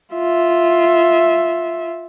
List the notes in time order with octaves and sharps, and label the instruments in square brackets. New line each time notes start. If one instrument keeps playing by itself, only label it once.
[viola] F4 E5